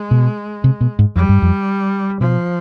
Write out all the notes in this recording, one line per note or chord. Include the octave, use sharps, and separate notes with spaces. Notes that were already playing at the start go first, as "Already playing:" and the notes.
Already playing: G#3
B2
C3
B2
G#2
F2 G3
G2
F2
B2 F3